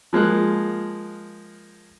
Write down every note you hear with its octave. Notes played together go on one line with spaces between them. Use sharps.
F3 G#3 A#3 F#6